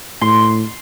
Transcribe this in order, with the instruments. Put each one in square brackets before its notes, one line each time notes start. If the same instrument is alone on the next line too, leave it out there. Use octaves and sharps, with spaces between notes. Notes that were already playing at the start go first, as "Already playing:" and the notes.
[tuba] A2 [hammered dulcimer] C6